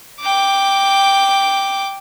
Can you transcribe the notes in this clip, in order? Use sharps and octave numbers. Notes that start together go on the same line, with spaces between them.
G5 D6